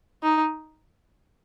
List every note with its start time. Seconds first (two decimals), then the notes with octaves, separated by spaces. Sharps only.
0.23 D#4